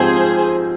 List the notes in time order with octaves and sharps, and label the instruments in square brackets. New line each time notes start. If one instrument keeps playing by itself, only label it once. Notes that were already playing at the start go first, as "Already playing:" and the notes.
Already playing: [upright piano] G#2 F3 C4 G4 [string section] G#4 C5